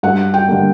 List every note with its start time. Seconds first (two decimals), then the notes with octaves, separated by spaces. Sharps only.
0.03 G2 F#5
0.34 G5
0.48 D3 G3 A#3